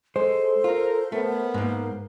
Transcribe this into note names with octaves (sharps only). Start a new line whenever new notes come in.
G#3 A4 C5
F4 A#4
A3 B3 A#4
G#2 A#3